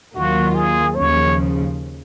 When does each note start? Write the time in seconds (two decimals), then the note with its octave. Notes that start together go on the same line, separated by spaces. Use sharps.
0.15 D#2 D#3 F#3 A#3 F4 F#4
0.55 G#4
0.95 D#2 C#3 F3 C#5